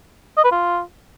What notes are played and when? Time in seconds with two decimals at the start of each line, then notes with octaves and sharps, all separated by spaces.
0.37 D#5
0.44 B4
0.51 F4